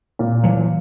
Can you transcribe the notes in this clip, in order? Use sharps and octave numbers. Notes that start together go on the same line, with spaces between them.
A#2
E3 F#3